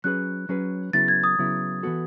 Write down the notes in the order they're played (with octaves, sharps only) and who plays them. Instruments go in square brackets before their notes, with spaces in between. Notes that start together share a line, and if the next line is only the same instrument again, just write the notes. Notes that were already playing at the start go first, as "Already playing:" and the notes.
[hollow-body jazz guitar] F#3 C#4 G#4 B4 [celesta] F#6
[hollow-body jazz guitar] F#3 C#4 G#4 B4
[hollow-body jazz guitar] C#3 F#3 B3 E4 [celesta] A6
[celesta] G#6
D#6
[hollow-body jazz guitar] C#3 F#3 B3 E4
E3 B3 F#4 A4